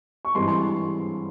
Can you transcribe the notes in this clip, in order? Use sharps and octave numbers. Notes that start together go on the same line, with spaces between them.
C#6
G2 E3 G#3 C4 C6
C6